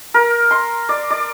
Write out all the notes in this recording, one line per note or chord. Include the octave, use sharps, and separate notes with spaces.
A#4
C6
D5
D5